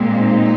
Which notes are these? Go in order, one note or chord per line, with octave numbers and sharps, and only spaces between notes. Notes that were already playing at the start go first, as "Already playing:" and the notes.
Already playing: A#2 G#3 C4
D#4